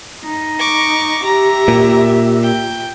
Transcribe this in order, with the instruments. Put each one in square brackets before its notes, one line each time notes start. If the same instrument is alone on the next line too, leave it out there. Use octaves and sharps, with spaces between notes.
[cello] D#4
[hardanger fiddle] C#6 D6
[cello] G4 E5 [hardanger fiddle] A#5
[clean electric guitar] A#2
[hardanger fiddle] G5